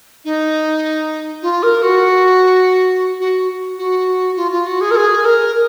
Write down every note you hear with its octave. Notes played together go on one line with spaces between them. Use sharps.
D#4
F4
A#4
F#4
F#4
F#4
F4
F4
F#4
G#4
A#4
G#4
A#4